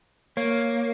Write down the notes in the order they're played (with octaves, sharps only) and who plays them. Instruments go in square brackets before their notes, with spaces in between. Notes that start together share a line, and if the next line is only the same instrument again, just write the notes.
[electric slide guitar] A#3 [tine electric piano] C#5